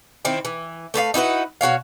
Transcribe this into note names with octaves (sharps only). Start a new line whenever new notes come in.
D#3 C4 E4
E3
A3 B4 C#5 F5
D#4 E4 F#4 B4
B2 F#4 C#5 F5